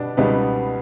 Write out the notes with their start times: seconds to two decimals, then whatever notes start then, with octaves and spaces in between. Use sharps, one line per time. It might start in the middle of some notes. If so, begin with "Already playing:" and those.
Already playing: B2 G3 B3 D4
0.17 C#2 B2 G3 B3 D#4